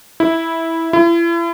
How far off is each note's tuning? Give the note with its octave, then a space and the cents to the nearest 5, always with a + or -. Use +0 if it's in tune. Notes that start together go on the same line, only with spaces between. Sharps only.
E4 -10
E4 +40